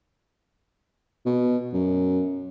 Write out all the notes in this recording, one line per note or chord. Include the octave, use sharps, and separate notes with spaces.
B2
F#2